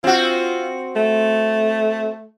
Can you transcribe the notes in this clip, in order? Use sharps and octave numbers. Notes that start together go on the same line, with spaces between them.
C4 F4 F#4
A3